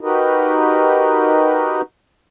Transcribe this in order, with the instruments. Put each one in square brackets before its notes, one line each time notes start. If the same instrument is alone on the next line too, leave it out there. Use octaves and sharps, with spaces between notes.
[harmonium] D#4 F#4 G4 A#4 B4 D#5